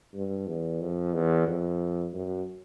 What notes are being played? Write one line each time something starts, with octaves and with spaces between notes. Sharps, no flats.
G2
E2
F2
E2
F2
F#2